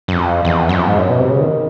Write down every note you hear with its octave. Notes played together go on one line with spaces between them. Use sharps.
F#2
F2
E2
F#2
F2
G#2
F#2
B2
C3
C#3
D#3